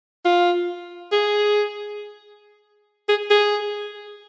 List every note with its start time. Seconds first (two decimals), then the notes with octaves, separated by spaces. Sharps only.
0.25 F4
1.12 G#4
3.09 G#4
3.30 G#4